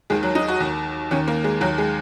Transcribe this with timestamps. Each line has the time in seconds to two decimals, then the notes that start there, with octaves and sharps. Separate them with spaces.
0.10 D#2 D#3 G#3
0.23 F#3
0.35 D#4
0.48 F#4
0.60 D#2 D#3
1.11 D#2 D#3 C#4
1.28 A#3
1.44 G#3
1.61 D#2 D#3 F#3
1.78 G#3